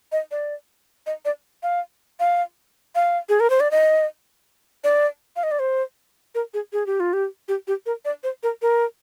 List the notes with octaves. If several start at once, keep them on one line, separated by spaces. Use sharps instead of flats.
D#5
D5
D#5
D5
F5
F5
F5
G#4
A#4
C5
D5
D#5
D5
F5
D#5
D5
C5
A#4
G#4
G#4
G4
F4
G4
G4
G4
A#4
D5
C5
A#4
A#4